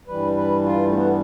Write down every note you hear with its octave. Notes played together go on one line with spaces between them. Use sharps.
G2 E3 G3 B4
B4
F4
A3
B3